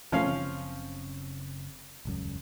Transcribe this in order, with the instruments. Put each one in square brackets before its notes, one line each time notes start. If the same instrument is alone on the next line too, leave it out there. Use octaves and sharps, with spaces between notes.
[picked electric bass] E1 A3 [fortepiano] F3 C#4 F5
[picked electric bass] F#1 C#3 C4
D#1 C#2 F#2